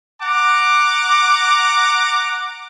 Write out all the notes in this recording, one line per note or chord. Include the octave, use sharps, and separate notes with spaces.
F#5 A#5 D6